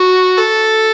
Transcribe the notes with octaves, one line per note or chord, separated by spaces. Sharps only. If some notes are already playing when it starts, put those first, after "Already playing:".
Already playing: F#4
A4